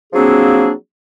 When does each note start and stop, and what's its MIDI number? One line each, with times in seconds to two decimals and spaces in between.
0.13 0.71 53
0.13 0.71 54
0.13 0.71 58
0.13 0.71 60
0.13 0.71 62
0.13 0.71 68